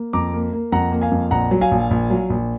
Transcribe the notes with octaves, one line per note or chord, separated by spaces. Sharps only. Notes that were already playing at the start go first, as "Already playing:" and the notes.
Already playing: A#3
F2 A#5 D6
A#3
A#3
F2 F#5 A#5
A#3
F5 G#5
F2
A#1 F#5 A#5
F#3
F5 G#5
A#1
A#1
F#3
A#1